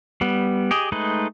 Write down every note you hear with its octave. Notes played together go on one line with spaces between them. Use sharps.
G3 B3
G4 G#4 D#5
G#3 A3 D#4 B4